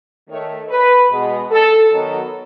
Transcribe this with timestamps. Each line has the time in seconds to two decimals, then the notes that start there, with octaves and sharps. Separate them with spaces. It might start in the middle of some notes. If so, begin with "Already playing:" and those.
0.29 D#3 A3 C#5
0.70 B4
1.11 B2 G#3 B3
1.51 A4
1.92 D#3 F#3 B3